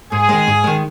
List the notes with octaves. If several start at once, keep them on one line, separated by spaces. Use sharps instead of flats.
G#2 G#4
D#3 G#3
G#2
D#3 G#3